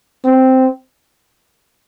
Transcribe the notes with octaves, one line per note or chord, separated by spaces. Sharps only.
C4